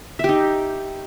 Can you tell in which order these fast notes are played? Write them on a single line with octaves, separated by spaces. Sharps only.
E5 G4 D#4